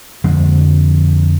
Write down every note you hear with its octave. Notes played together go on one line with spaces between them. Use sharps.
F2 D3 F3 G#3